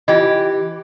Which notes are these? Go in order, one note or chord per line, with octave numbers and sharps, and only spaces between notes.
E3 F4 G4 D#5